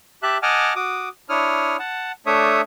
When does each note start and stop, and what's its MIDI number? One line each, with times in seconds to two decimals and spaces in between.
0.23 0.38 67
0.23 0.38 76
0.23 0.38 81
0.23 0.38 90
0.43 0.73 75
0.43 0.73 78
0.43 0.73 80
0.43 0.73 81
0.43 0.73 86
0.43 0.73 89
0.76 1.09 66
0.76 1.09 86
0.76 1.09 87
1.29 1.77 62
1.29 1.77 64
1.29 1.77 73
1.29 1.77 87
1.29 1.77 89
1.79 2.12 78
1.79 2.12 81
2.26 2.61 57
2.26 2.61 62
2.26 2.61 73
2.26 2.61 76
2.26 2.61 87